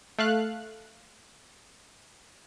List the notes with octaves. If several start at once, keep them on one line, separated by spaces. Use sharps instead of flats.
A3 F5 F#6